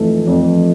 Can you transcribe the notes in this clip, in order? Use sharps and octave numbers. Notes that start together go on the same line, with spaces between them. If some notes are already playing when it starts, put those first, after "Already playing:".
Already playing: F2 E3 A3
F2